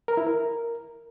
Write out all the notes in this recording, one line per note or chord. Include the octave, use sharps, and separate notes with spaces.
A#4
E4
A#4